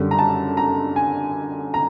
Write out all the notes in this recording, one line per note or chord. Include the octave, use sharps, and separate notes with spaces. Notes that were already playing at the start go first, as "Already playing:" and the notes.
Already playing: F#2 D3 G3
A#5
A5
A#5
G#5
A#5